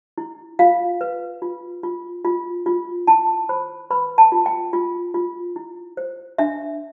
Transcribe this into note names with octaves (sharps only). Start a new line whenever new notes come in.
E4
F4 F5
B4
F4
F4
F4
F4
E4 A5
C5 B5
B4 B5
A5
F4
G5
F4
F4
E4
C5
D4 E5